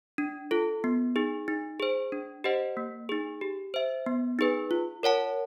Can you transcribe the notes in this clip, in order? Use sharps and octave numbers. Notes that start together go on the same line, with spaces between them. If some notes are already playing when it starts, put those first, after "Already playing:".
D4
F4 A4
B3
D#4 G#4
D#4
G#4 C5
D4
G4 C5 D#5 F#5
A#3
D#4 G#4
G4
C5 E5
B3
D#4 G#4 B4
F4
A#4 C#5 F#5 A5